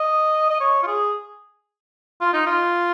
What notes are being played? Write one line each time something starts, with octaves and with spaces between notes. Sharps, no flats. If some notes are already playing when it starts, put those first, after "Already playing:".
Already playing: D#5
D#5
C#5
F4
G#4
F4
D#4
F4